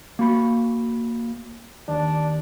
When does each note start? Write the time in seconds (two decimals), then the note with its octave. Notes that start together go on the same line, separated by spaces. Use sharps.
0.19 A#3 F#4 B5
1.88 D#2 D4